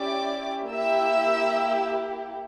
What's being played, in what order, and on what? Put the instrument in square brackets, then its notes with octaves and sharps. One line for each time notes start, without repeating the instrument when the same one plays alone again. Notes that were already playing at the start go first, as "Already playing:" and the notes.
Already playing: [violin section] C#4 E4 G4 D5 D6
A#3 E4 G4 E5 E6